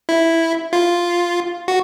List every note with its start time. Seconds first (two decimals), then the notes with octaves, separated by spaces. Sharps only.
0.09 E4
0.73 F4
1.68 F#4